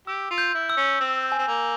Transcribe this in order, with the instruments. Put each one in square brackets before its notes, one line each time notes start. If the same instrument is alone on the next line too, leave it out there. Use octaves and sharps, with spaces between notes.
[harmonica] G4 [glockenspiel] E6
[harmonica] F4
[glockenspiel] G6
[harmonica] E4
[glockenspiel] E6
[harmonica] C#4
[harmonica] C4 [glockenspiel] E6
[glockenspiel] G#5
[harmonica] C4
A#3